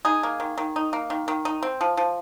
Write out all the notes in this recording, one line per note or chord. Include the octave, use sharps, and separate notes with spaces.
D#4 G#4
A#3
D#3
D#3
D#4
A#3
D#3
D#3
D#4
C4
F3
F3